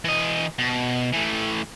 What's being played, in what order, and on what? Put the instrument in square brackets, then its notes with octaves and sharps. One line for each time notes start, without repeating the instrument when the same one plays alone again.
[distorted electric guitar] E3 D#5
B2
E3 A3